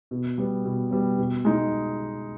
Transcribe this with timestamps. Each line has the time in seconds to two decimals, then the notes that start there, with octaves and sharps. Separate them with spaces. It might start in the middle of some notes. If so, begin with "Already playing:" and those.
0.11 B2
0.38 G3 B3
0.65 B2
0.91 G3 B3
1.18 B2
1.45 G#3 D#4